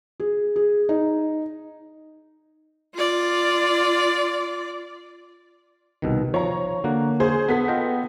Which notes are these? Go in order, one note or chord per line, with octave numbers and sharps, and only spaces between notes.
G#4
G#4
D#4
F4 D5
C2 B2 D#3
F3 C#5 A#5
D3 A#3 F#4
G#4 C5
B3 A4 B6
F4 D#5 G5